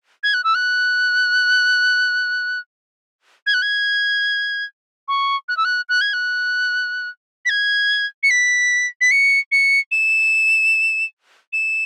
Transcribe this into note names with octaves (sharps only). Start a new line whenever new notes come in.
G#6
F#6
E6
F#6
G#6
F#6
G#6
C#6
F#6
E6
F#6
F#6
G#6
F#6
B6
G#6
C#7
B6
B6
C#7
C#7
E7
E7